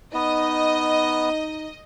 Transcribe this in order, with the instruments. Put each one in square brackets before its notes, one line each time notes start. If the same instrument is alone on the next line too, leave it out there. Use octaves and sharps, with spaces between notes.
[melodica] B3 [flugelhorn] D#4 [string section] D#5